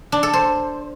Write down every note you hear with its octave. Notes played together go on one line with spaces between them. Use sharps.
D4
A4
C5